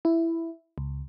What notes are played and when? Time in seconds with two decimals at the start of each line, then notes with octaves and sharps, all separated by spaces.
0.05 E4
0.78 C#2